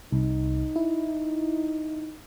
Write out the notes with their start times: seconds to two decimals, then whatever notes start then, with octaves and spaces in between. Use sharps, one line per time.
0.12 C2 D#4
0.76 E4